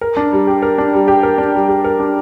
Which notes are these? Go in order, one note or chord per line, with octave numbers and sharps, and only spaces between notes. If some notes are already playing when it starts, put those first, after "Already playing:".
A#4
D4
G3
G4
A#4
D4
G3
G4
A#4
D4
G3
G4
A#4
D4